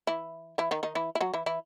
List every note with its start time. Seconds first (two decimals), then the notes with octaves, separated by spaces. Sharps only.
0.07 E3 E4
0.58 E3 E4
0.71 D#3 D#4
0.83 D#3 D#4
0.95 E3 E4
1.15 E4
1.21 F#3 F#4
1.34 E3 E4
1.46 E3 E4